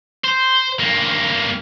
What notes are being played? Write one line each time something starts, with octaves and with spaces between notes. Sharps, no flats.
C5
G2 A#3